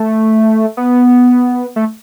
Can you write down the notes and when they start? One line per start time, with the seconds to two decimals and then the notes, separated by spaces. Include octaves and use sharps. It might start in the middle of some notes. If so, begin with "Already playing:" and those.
Already playing: A3
0.77 B3
1.76 A3